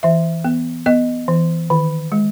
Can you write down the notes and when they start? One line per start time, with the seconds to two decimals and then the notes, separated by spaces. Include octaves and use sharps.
0.03 E3 E5
0.45 B3
0.86 B3 D#5
1.28 E3
1.70 D#3
2.12 G#3